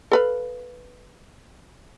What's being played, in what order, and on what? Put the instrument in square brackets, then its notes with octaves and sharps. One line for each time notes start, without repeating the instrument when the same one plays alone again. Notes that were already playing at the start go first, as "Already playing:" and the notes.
[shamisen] A4 B4 F5